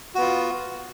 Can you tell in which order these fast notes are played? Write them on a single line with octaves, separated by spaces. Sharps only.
F#4 B3 F4